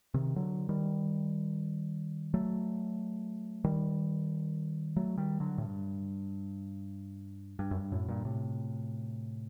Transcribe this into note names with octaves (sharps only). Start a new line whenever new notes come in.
C3 D#3
D3 F#3
D#3 G3
F#3 A3
D#3 G3
F#3 A3
D#3 G3
D3 F#3
A2
G2
G2
F#2
G2
F#2 A2
G2 A#2
A2 C3